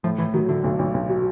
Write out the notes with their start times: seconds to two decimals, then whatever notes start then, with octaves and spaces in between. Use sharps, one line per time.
0.04 A2 F3
0.18 A2 E3
0.34 D#3 F#3
0.49 A2 D3
0.64 B1
0.79 B1
0.94 B1
1.10 F#3